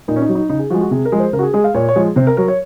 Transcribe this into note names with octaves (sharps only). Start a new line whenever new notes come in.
A#2 D#4
C#4
D#4
F#3
D#4
C#3 D#4
G#4
F3 G#3 F#4
F#4
C3 G#4
A#4
F3 G#3
C5
C#3 A#4
F#4
G#4
G#3 G#4
F5
A#2 C#5
C#5
F3 G#3
C3 C5
A#4
F#3 A#4
C#5